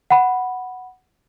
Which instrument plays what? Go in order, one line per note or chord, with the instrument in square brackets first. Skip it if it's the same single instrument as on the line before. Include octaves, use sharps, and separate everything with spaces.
[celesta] F#5 B5